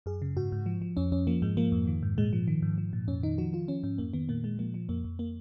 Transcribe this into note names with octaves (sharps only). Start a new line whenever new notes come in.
F#2 G#4
C#3
G#2 F#4
G#2
F3
F3
F2 C#4
F2 C#4
F3 A#3
G#2 G#3
F3 A#3
F2
D#3
G#2
A#2 G#3
F3
D#3
G#2
F3
A#2
F2 C#4
D#3 D#4
F3 F#4
F3 F4
F3 C#4
G#2 C#4
F2 A#3
D#3 B3
A#2 A#3
A#2 G#3
F3 A#3
F3
F2 A#3
F2
A#3